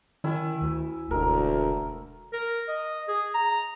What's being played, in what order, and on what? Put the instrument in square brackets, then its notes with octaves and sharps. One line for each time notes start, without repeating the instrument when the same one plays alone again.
[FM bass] D#3 [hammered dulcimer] E4 G#5
[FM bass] D2
[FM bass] E1 [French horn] D2 [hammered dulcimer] A#4
[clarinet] A#4
D#5
G#4
A#5